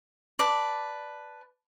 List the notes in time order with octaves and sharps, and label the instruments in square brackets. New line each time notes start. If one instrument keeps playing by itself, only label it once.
[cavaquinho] B4 D5 A5